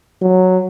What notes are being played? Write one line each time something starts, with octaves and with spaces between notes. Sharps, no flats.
F#3